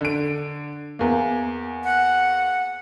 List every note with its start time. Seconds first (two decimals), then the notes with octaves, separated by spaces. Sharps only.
0.01 D3 D7
0.99 E2 A#3
1.84 F#5